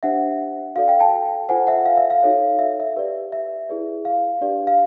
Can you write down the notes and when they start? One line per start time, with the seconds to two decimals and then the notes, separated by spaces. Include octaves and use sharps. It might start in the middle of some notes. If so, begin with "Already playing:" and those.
0.03 D4 G4 C5 E5 F#5
0.76 F#4 A4 D5 F5
0.88 F5 G5
1.00 G5 A5
1.49 F4 A4 C5 F#5 G#5
1.67 E5 F#5
1.85 F5
1.98 E5
2.10 F5
2.23 D#4 F#4 A4 C#5
2.59 E5
2.80 E5
2.96 G4 B4 D5
3.32 E5
3.69 E4 G#4 B4 D5
4.05 F5
4.41 D4 G4 B4 D5
4.67 F5